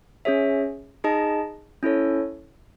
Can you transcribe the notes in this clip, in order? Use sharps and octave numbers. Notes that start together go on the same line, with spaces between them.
C#4 G#4 C#5 E5
D#4 G#4 D#5 A5
C#4 E4 A4 C#5